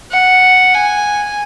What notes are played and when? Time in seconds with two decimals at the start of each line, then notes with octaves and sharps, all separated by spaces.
0.11 F#5
0.74 G#5